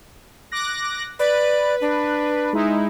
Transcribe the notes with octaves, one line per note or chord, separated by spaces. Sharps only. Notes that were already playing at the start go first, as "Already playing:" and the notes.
D6 F#6 A#6
B4 D5
D4
G#3 D#4 E4